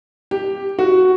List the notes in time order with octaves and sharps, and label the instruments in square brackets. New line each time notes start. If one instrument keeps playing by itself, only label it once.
[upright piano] G4
F#4